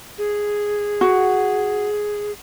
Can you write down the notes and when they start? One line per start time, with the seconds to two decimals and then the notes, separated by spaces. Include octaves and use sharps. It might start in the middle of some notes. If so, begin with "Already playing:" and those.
0.18 G#4
1.01 F#4